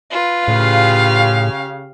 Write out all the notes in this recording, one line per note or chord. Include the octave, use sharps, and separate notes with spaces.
F4 B4
A2 C#3 G4 F5